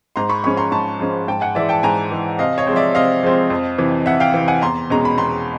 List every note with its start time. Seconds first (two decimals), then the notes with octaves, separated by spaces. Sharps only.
0.16 G#2 A#5 C6
0.30 B5 C#6
0.44 F3 G#3 C#4 B5 C#6
0.57 A#5 C6
0.71 G#2 A5 B5
0.99 F3 G#3 C#4
1.28 G#2 G5 A5
1.41 F#5 G#5
1.55 E3 G#3 D5 E5
1.69 G5 A5
1.83 G#2 G#5 A#5
2.11 E3 G#3
2.39 C3 D#5 F5
2.58 C#5 D#5
2.67 F3 G#3 C4
2.76 D5 E5
2.95 C3 D#5 F5
3.23 F3 G#3 C4
3.50 F2
3.78 C3 E3
4.06 F2 E5 F#5
4.20 F5 G5
4.34 C3 E3
4.48 F#5 G#5
4.62 E2 A#5 C6
4.90 B2 G#3 C#4 A#5
5.05 B5
5.17 E2 A#5 C6